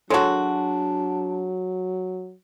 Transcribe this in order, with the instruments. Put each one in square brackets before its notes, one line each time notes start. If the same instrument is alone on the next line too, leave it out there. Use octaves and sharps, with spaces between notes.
[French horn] F#3 [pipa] G#3 F#4 [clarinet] D4 [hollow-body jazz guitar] A4 C#5 A5